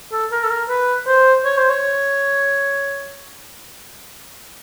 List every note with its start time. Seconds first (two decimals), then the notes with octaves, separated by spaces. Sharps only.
0.12 A4
0.32 A#4
0.44 A4
0.50 A#4
0.69 B4
1.07 C5
1.45 C#5
1.58 C5
1.70 C#5